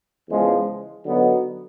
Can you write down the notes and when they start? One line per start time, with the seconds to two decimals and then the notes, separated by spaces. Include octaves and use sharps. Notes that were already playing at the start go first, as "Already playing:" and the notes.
0.29 E2 C#3 F3 G#3
1.04 D3 F#3 B3 D#4